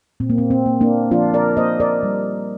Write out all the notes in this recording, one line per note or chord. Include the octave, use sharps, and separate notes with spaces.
A#2 C4
A#3
C4
C4
A#3
A#3 D4
F3 D4 F4
A#4 D5
A#3 C5 D#5
A#4 D5
G3